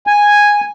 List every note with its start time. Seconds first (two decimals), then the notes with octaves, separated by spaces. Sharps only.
0.07 G#5